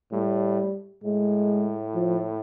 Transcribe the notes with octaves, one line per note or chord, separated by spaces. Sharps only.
A2 G3
A2 G#3
F3